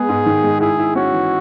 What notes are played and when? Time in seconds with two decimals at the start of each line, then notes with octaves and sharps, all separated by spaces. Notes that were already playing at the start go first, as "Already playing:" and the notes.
Already playing: G#3 B3 G#4
0.09 G#2
0.26 D#3
0.43 G#3
0.61 E4 G#4
0.79 E4
0.95 C#4 F#4
1.13 E3